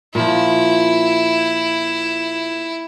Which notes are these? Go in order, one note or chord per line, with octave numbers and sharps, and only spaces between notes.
A#2 F3 E4